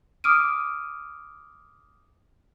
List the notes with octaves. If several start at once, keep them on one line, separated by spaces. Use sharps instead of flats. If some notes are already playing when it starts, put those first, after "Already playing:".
D6 D#6 F6 D7 D#7